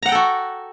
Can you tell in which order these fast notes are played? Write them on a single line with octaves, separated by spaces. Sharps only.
A#5 F#5 G5 A4 F#4